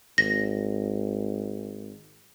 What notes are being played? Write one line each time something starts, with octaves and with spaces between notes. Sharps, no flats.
G#1 A#6